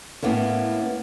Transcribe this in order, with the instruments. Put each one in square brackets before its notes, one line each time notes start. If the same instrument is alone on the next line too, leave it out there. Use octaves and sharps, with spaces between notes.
[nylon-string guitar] A2 A#3 B3 C#4